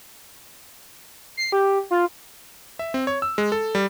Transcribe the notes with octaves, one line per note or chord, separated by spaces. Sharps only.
C7
G4
F4
E5
C4
C#5
E6
G#3
A4
G3